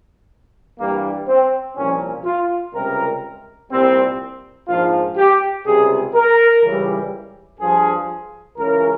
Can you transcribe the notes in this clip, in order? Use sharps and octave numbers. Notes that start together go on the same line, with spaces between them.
G2 E3 G3 A#3
C4
C2 A#2 F3 C#4
F4
C#2 C3 G3 A#4
C2 A#2 G3 C4
A#1 G#2 F3 F4
G4
C#2 C3 G3 G#4
A#4
C#2 C#3 E3 G3
G2 F3 G#4
C#2 C#3 E3 A#4